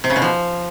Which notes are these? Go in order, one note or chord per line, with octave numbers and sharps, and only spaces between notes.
C3
C#3
B2
F3